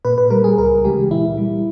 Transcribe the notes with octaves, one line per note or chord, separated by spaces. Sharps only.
A#2 B4
B4
G3 A#4
G#4
C#2 A#4
C#3 E3 G#3 G4
A#2 E4
G3